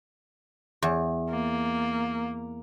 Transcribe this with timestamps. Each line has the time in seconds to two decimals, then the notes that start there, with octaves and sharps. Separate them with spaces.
0.82 E2
1.29 A#3